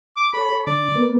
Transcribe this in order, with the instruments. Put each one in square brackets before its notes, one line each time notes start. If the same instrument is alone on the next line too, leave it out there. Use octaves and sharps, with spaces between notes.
[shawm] D6
[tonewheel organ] A4 C#5 [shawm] B5
[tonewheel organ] A4 C#5
[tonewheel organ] D3 [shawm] D5
[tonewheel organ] A#3 B3